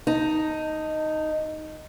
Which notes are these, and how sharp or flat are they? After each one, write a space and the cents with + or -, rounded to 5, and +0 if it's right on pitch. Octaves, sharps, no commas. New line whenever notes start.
D#4 +0 A5 +30